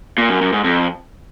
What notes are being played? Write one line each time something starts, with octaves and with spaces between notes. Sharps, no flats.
A#2
F#2
F#2
G#2
F2